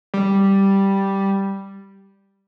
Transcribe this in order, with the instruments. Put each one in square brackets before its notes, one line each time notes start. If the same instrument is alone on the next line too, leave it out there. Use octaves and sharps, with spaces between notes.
[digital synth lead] G3